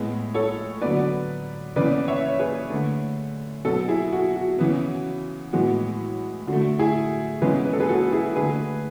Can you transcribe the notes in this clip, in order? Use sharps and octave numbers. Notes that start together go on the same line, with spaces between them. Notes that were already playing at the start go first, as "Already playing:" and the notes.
Already playing: A2 G#3 B3
A4 C#5
D3 F#3 B3 B4 D5
C#3 E3 B3 B4 D5
C#5 E5
C#5
G#4 B4
D3 A3
B2 F#3 B3 F#4 A4
E4 G#4
F#4
F#4
C#3 E3 B3
A2 E3 G#3 B3 F#4
D3 F#4
A3
E4 G#4
C#3 E3 G#3 B3 G#4 B4
B4
A4
G#4 B4
F#4 A4
E4 G#4
D3 A3 G#4 B4